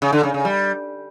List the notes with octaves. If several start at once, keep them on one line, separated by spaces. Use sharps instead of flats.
C#3
D3
C#3
C#3
G3